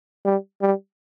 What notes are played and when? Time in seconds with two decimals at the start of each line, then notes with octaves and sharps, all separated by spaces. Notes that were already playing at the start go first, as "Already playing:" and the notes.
0.25 G3
0.62 G3